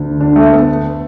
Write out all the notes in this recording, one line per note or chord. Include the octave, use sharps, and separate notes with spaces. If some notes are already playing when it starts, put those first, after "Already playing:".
Already playing: D2 D3
D4
A3
B3